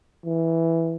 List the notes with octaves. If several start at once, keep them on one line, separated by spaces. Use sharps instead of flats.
E3